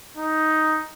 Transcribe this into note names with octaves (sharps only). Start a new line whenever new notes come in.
D#4